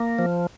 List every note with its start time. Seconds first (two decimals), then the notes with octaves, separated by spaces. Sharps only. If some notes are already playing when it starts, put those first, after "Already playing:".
Already playing: A#3
0.19 F3